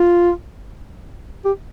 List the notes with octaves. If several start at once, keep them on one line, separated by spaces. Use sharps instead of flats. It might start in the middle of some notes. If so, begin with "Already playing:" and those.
Already playing: F4
G4